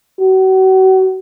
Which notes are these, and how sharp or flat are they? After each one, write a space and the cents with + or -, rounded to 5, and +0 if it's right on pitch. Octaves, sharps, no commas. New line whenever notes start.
F#4 +35